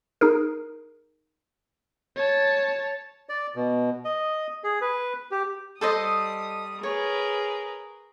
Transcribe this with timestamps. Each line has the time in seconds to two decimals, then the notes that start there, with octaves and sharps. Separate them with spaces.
0.21 D#4 G#4 A#4
2.17 C#5 A5
3.29 D5
3.56 B2
4.05 D#5
4.64 G#4
4.82 B4
5.31 G4
5.81 G3 A4 C5 D#5 D#6
6.83 G#4 A#4 B4 C#5